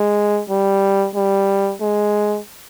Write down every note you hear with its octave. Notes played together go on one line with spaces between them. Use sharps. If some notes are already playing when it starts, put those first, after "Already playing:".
Already playing: G#3
G3
G3
G#3